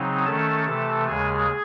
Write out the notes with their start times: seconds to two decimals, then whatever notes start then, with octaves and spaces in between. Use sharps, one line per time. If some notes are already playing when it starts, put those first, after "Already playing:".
Already playing: C#3 F#3 C4 D#4
0.25 D#3 A3 C#4 A4 A5
0.67 C3 E3 A3 A4 A5
1.08 D#2 C#3 G#3 G#4 G#5